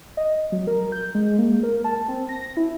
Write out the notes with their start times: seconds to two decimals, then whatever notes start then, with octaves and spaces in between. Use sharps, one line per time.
0.17 D#5
0.52 F#3
0.67 A#4
0.92 G6
1.15 G#3
1.38 A#3
1.63 A#4
1.84 A5
2.08 C4
2.29 A#6
2.57 E4